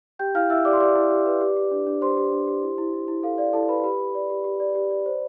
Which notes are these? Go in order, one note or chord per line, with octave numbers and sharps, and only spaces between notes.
G4 G5 G6
E4 F5 F6
E4 E5 E6
G4 D5 D6
C6
G4 D5 D6
E4
G4
B4
G4
G4
D4
D4
G4 C5 C6
G4
D4
G4
E4
E4
E4
E4
A4 F5
D5 F5
E4 A4 A5
E4 B4 B5
G4 B4 B5
G4
D5
G4
G4
D5
G4
D5
C5